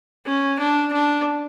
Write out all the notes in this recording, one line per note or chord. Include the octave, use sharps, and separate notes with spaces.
C#4
D4
D4